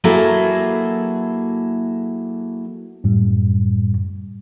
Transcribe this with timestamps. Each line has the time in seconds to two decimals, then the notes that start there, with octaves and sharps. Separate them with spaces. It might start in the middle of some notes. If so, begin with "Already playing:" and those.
0.04 F#3 A#3 E4 G#4 A4
3.04 F#2 A2 G3